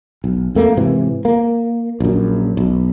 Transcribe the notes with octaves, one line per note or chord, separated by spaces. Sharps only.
B1
F2 A3 A#3
G#2 C3 E3
A#3
A#1 F#2
B1